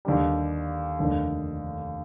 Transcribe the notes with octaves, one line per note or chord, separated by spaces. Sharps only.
D#2 D3 G3
F1 D#2 D3